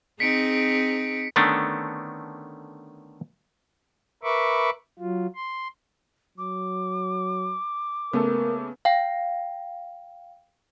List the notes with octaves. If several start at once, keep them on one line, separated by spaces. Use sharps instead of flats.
C4 D#4 G#4 B6 C#7 D7
D3 D#3 A3 B3 C#4 D4
A#4 B4 E5 B5 C#6 D6
F#3 F4
C6
F#3 D6
C#3 A3 B3 A4 A#4
F5 G5